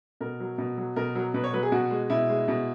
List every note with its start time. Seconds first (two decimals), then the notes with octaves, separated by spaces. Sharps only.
0.21 B2 A#4
0.40 F#3
0.58 B2
0.77 F#3
0.96 B2 A#4
1.15 F#3
1.34 B2 B4
1.44 C#5
1.53 F#3 B4
1.63 G#4
1.72 B2 F#4
1.91 G#3
2.10 B2 E4
2.29 G#3
2.48 B2